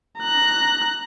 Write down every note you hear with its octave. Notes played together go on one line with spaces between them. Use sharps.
A#5 F#6